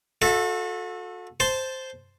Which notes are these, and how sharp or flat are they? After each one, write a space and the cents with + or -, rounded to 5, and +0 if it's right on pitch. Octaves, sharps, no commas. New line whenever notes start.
F#4 -40 A4 -5 E5 +5
C5 +0 A5 +0 C6 +0